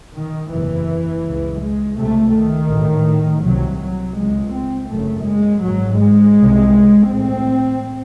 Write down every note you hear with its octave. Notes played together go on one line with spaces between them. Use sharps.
D#3
F#1 E2 C3 E3
C#2 C#3
G#3
C#2 C3 A3
D#3
A1 A2
C2 C3 F#3
F#3
C#2 C3 G#3
C4
F#1 F#2 C#3 A3
G#3
G#1 G#2 F#3
G#3
C2 C3
A1 A2 C4